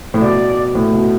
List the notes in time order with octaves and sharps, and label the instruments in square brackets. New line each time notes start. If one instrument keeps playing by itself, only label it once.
[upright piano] A2
[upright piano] B2 [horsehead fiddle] D5
[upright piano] A2
B2